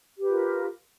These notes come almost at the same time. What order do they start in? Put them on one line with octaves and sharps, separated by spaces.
G4 B4 F4 A#4